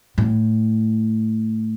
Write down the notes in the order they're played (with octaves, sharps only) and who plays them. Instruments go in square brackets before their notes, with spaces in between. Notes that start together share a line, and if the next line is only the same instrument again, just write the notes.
[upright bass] A2